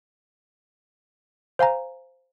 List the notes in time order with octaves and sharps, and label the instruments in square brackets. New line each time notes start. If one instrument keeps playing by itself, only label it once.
[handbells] C5 F5 G#5 A#5